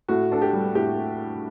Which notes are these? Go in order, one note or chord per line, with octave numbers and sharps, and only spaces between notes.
A2 F#4
D4 A4
G4
G3
A2 G4